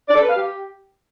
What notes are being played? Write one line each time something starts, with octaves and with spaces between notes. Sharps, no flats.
D5
A4
B4
F5
G4